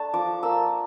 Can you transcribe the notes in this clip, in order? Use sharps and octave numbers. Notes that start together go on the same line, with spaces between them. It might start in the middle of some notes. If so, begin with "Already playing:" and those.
Already playing: A3 D4 A5
F3 D6
A#3 E6